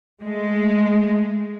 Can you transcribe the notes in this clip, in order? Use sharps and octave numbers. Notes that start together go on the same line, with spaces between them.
G#3 A3